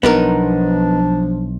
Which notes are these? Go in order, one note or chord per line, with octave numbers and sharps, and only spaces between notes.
B1 F3 B3 D4 D#4 A#4